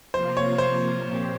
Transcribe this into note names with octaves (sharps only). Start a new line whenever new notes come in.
C3 F3 A#3 F4 C5
C#5
C5
A#2 F3 C4 G4